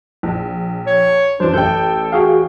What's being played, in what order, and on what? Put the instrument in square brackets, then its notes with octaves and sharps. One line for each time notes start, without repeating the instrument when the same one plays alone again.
[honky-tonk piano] A#1
[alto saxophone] C#5
[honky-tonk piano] F#2 [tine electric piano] E3 C5 [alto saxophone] D4
[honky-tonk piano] A1 G5 [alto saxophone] A4 [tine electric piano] G6
[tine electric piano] F#4 G#4 F5